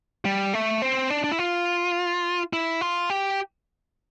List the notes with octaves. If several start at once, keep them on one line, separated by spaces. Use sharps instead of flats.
G3
A3
C4
D4
D4
E4
F4
E4
F4
G4